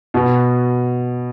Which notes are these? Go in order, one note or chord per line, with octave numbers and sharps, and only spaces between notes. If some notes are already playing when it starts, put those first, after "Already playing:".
B2